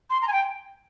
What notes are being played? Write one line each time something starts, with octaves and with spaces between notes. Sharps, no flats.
C6
A#5
G#5
G5